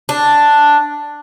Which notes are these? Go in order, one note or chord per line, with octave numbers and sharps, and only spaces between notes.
D4